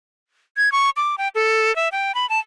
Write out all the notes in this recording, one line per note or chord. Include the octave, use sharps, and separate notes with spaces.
G#6
C#6
D6
G5
A4
E5
G5
B5
A5